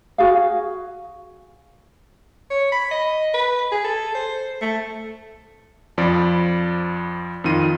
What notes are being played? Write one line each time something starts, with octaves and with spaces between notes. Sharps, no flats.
F#4 G#4 F5
C#5
B5
D#5
B4
G#4
A4
C5
A3
F2 F3 D5 B5
F2 D#3 F4 D#7